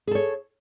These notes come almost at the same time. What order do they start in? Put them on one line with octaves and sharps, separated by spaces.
G#4 A4 C#5